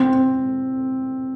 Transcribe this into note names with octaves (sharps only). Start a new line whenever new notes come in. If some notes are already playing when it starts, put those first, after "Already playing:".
Already playing: C4